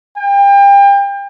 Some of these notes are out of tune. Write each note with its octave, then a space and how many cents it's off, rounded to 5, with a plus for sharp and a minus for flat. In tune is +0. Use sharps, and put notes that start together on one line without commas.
G5 +35